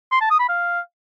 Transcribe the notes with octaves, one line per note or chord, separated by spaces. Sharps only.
C6
A5
D#6
B5
F5